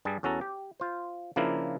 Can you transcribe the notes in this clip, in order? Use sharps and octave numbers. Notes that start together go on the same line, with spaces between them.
G2 G3 G#4 A5
E2 C#4 F#4 A4 A#5
G4
F4 C5
C#3 F3 A#3 D4 E4 A#4